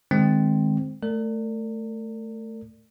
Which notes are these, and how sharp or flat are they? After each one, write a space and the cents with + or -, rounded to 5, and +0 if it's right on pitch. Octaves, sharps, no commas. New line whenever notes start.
D#3 -20 G#3 +0 C4 +0
A3 +0 A#4 -40 D5 +0